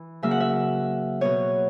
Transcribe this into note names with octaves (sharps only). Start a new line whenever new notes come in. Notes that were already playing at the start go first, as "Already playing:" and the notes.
Already playing: E3
C#3 F#3 A#3 E5
F#5
E5
B2 F#3 B3 C#5